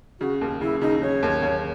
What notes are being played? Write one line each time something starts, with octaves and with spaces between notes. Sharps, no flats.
C#3 F#4
D#2
C#3 E4
C#3 D#4
C#3 C#5
D#2
D#2